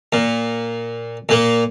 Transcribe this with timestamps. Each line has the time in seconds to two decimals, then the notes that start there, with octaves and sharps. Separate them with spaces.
0.13 A#2
1.29 A#2 A#3